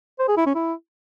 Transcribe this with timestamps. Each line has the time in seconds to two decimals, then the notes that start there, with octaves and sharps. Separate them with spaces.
0.19 C5
0.28 G#4
0.37 E4
0.46 C#4
0.55 E4